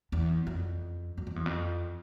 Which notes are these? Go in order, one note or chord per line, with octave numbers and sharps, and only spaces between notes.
E2
F2
F#2
F2
E2
F2